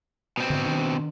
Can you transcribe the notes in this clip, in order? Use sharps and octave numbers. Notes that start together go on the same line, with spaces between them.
B2 C4
G#2 D3
D#3 D4